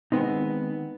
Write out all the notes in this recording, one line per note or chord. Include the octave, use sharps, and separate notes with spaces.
D#3 E3 G#3 B3 C4 D#4